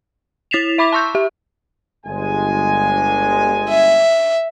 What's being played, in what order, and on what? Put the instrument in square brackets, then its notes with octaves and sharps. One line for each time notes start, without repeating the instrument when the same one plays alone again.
[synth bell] E4 A6 B6 C7 E7 F7
E5 B5 D6 B6 F7
A5 C6 C#6 E6 G6
G4 E5
[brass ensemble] G1 G#3 G#5
[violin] E5